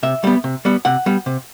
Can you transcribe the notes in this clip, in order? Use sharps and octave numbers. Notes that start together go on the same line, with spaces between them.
C3 E5
G3 B3
C3
G3 B3
C3 F#5
G3 B3
C3